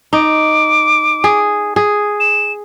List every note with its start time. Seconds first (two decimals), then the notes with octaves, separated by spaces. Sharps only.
0.13 D#4 D6
1.24 G#4
1.76 G#4
2.20 E7